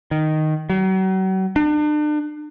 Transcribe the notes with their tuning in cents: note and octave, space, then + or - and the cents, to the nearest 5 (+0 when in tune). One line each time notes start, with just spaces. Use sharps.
D#3 -5
F#3 +40
D4 +40